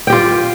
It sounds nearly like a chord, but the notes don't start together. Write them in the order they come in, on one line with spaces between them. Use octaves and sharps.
G5 G4 F4